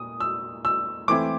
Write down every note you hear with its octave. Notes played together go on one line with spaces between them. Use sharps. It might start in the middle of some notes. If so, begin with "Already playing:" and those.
Already playing: A#2 D#6
E6
E6
E3 A3 C4 E4 D6